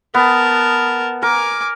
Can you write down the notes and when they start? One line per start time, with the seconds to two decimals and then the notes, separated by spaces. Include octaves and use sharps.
0.15 B3 A#4 A5
1.23 A#4 G#5 D6